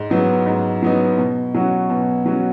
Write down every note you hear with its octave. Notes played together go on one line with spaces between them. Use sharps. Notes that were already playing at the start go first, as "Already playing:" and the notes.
Already playing: G#2
F#3 B3 D#4
G#2
F#3 B3 D#4
B2
F#3 C#4 F#4
B2
F#3 C#4 F#4